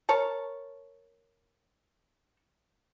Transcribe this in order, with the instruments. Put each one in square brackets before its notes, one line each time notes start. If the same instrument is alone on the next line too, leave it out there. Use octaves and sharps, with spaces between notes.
[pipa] A#4 C#5 A5